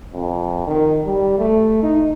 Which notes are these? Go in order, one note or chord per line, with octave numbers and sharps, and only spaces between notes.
F2
D#3
G3
A3
D#4